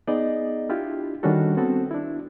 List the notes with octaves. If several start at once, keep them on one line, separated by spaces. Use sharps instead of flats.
B3 D#4 G#4 D5 D#5
D4 E4 F4 G4
D#3 G3 C#4 D4 F#4 A4
B3 C4 F#4 A4
D4 E4